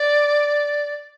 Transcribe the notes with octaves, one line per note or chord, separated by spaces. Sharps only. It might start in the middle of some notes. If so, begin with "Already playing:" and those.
Already playing: D5